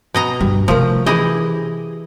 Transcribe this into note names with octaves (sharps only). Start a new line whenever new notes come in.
B2 D#5 A#5
G2 G3
C3 D#3 F3 A3 A#4
E3 E4 G4 G#4 D#5 B5